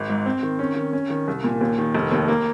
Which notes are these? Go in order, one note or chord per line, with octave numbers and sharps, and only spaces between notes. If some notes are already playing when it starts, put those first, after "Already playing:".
Already playing: G#1
G#2
C4
D#3
C#4
D#3
C#4
D#3
C2
A#2
D#2
D#3
F1
D#2
A#3